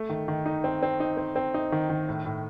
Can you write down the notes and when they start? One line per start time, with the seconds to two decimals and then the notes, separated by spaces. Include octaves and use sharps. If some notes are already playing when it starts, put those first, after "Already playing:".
Already playing: A3
0.09 D#3
0.28 D#3
0.46 D#4
0.64 C4
0.83 C4
1.00 D#4
1.17 C4
1.36 C4
1.54 D#4
1.72 D#3
1.90 D#3
2.08 A2
2.25 A2